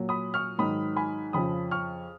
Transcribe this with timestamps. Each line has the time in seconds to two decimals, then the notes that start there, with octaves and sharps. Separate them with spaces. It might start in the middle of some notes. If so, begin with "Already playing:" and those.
Already playing: A#2 F#3
0.09 B5 D#6
0.34 C#6 F6
0.59 G#2 D#3 F#3 B5 D#6
0.96 G#5 B5
1.33 F2 C#3 F3 B5 D#6
1.71 C#6 F6